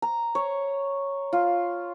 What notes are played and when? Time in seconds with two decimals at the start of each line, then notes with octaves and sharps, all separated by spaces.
0.02 A#5
0.35 C#5
1.33 F4